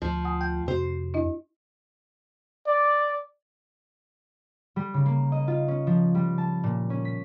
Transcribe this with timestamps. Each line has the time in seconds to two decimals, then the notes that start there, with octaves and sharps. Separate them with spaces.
0.02 D2 F3
0.25 F#5 G#5 D#6
0.41 G5 G6
0.68 F2 C3 F#4 C5
1.14 D4 E4 D#5
2.67 D5
4.76 G3
4.94 C#3
5.06 A#3
5.32 D#5
5.48 F4
5.68 C#4
5.87 F3
6.15 G3
6.38 A5
6.64 A#2
6.90 C#4
7.05 B6